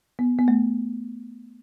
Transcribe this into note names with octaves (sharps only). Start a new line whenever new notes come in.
B3
B3
A3